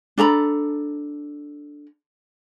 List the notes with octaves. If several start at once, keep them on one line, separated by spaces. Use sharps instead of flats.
D4 A4 A#5 B5